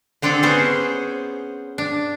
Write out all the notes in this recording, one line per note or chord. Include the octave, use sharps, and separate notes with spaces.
D3 C4 D4 G#4 A4
B3 C#4 G#4 C5
D4